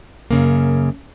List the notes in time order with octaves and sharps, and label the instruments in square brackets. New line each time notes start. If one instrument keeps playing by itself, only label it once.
[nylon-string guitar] F#2 C#3 A#3